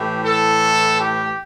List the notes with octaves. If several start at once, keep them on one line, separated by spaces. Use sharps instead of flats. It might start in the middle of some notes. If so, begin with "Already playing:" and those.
Already playing: A2 E3 G4
A4
G4